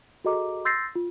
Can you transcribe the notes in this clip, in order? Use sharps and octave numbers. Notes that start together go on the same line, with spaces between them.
F#4 G#4 A4 D#5 A#5 D6
C6 E6 G6 A6 A#6 C7
F4